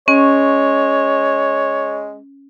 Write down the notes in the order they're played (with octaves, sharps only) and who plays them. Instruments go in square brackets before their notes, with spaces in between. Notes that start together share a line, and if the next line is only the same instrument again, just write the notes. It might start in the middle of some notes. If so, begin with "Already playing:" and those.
[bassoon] G#3 [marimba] C#4 [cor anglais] C#5